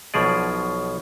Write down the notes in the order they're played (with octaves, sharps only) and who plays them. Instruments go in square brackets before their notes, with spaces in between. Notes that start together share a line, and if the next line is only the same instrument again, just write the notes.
[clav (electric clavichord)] B1 B2 F3 G#4 D5